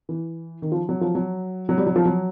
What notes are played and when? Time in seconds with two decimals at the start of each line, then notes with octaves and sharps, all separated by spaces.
0.09 E3
0.62 D#3
0.72 F3
0.89 F#3
1.01 F3
1.15 F#3
1.69 F#3
1.78 G3
1.87 F#3
1.96 F3
2.05 F#3